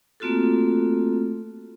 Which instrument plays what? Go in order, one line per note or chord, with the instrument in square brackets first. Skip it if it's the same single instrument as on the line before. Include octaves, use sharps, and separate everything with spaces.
[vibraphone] A3 A#3 C4 F4 F#4 A4